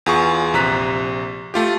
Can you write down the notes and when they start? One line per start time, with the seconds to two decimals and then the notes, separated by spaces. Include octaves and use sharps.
0.06 E2 F4 G#4 C#6
0.54 A#1 C3 A#5 F#6 B6
1.54 A3 F4 G4